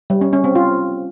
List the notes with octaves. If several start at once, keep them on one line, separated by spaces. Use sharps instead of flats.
G3
C#4
C#4
C4
F4